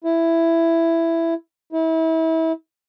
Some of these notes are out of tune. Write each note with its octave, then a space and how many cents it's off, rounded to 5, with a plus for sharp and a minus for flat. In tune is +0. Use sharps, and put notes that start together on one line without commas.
E4 +10
E4 -30